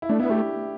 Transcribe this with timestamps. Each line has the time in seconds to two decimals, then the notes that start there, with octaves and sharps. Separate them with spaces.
0.02 E4
0.09 A3 D4
0.20 B3 E4
0.30 A3 G4